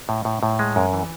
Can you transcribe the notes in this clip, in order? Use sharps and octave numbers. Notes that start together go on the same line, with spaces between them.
A2
A2
A2
G#3
F#2
E3